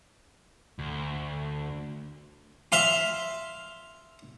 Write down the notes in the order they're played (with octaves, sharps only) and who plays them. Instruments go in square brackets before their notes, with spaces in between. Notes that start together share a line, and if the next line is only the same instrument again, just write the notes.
[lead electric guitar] D2
[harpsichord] E5 F5 C6